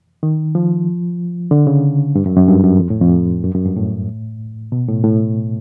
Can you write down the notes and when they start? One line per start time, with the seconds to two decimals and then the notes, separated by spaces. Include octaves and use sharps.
0.23 D#3
0.55 F3
1.51 D3
1.67 C#3
2.15 G2
2.26 F#2
2.37 F#2
2.48 G2
2.64 F#2
2.80 F2
2.90 A2
3.02 F2
3.44 F#2
3.55 F#2
3.66 G2
3.77 A2
4.72 B2
4.88 A2
5.04 A2